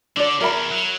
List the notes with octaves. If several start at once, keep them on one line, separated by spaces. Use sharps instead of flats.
D3 D4 D5
E2 A#4 E5 B5
F#3